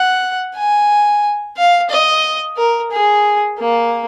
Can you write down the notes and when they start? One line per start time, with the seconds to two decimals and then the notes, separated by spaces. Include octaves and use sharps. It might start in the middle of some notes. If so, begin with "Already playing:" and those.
Already playing: F#5
0.55 G#5
1.57 F5
1.90 D#5
2.57 A#4
2.92 G#4
3.59 A#3